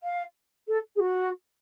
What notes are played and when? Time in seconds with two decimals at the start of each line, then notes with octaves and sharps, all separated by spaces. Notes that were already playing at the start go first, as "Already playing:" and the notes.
0.03 F5
0.67 A4
0.95 G#4
0.99 F#4